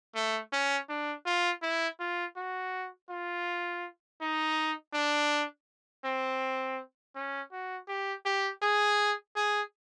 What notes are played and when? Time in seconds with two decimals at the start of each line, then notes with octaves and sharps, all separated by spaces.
0.15 A3
0.53 C#4
0.89 D4
1.26 F4
1.62 E4
2.00 F4
2.37 F#4
3.10 F4
4.21 D#4
4.94 D4
6.04 C4
7.15 C#4
7.52 F#4
7.88 G4
8.25 G4
8.62 G#4
9.36 G#4